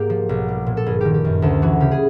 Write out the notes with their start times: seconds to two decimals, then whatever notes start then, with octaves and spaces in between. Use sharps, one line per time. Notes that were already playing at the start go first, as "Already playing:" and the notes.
Already playing: G#2 A#3 G4
0.10 F3
0.29 B1
0.48 G3
0.66 A#2
0.77 A4
0.86 G1 G#4
1.01 D#3 G4
1.14 G4
1.25 F#2
1.42 D2 A4
1.62 E3 F#4
1.80 C#3 G4
1.91 G#4